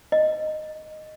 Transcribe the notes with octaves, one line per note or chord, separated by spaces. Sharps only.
D#5